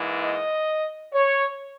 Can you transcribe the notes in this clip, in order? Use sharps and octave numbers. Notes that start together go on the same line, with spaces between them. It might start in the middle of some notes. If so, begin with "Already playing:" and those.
Already playing: G#2 E3 A#3
D#5
C#5